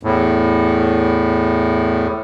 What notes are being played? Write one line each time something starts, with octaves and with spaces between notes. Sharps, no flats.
E2 A2